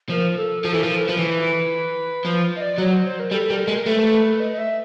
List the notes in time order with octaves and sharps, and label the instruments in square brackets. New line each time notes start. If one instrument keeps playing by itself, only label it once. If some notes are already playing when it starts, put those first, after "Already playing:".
[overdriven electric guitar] F3 [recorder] A#4
[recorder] A4
[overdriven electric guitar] F3 [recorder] A4
[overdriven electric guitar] E3
[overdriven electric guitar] F3 [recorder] A#4
[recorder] B4
[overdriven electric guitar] F3
E3
[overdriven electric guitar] F3 [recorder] C5
[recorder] D#5
D5
[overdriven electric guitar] F#3 [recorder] C#5
[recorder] C5
C5
A#4
[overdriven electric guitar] G3 [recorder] A4
[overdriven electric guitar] G3 [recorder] A#4
[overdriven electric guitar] G#3 [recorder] A#4
[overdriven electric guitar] A3 [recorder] B4
[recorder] C5
B4
D#5
D#5
E5